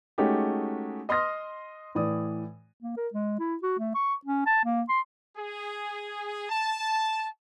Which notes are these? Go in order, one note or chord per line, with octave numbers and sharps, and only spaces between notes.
G#3 A3 C#4 D#4 F#4 G4
D#5 C6 D#6 F6 A#6
A2 E3 D5 D#6
A#3
A#4
G#3
E4
F#4
A3
C#6
C#4
A5
A#3
C6
G#4
A5